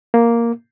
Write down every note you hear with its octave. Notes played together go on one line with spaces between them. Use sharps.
A#3